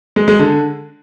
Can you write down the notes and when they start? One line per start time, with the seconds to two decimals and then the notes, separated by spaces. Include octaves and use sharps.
0.16 G#3
0.28 G#3
0.39 D3